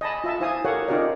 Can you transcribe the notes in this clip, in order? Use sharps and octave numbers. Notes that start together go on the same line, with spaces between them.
D#5 G#5 A5 B5
F4 E5 A5
E4 C5 F5 G#5 D#6
G4 A4 A#4 C#5 F5 F#5
C#4 D#4 F4 G4 A#4 D5